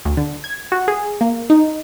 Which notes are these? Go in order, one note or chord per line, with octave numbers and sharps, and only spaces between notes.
D2
D3
G#6
F#4
G#4
A#3
D#4